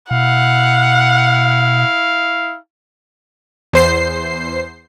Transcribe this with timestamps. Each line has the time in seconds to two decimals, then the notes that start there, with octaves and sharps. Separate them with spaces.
0.11 B2 E4 F5 F#5
3.73 E2 C5 C7